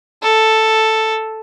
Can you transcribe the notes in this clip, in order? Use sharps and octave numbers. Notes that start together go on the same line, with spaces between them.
A4